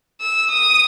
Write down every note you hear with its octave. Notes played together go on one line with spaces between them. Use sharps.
E6
D#6